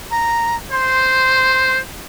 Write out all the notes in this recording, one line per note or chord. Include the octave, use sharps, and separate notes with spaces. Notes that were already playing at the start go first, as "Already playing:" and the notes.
A#5
C5 C6